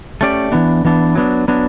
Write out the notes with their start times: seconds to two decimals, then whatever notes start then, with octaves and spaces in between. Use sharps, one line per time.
0.21 A3 C#4 G4 D5
0.52 E3 B3 D4
0.85 E3 B3 D4
1.15 F#3 B3 D4
1.48 F#3 B3 D4